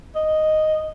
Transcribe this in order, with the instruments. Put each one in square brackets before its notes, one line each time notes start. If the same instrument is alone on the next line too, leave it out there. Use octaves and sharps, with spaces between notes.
[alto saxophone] D#5